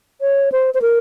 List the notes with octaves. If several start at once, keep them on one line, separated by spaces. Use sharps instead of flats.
C#5
C5
C5
A#4